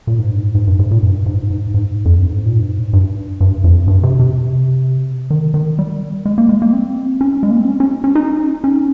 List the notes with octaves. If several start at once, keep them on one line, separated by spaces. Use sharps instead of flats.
A#2
G#2
G2
G#2
G#2
G2
G#2
A#2
G2
G#2
G#2
G#2
F2
G2
G#2
A#2
G2
G#2
G2
G2
F2
G2
C3
C3
D#3
D#3
G3
G#3
A#3
G#3
A#3
C4
C#4
G#3
A#3
C4
C#4
C#4
C#4
D#4
C#4